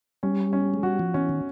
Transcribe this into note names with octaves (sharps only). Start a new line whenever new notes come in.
G3 C#4
C#4
G#3
G3 F#4
F3
E3 C#4
D#3